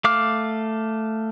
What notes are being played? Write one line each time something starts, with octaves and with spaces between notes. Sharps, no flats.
A3 F5 D6 F6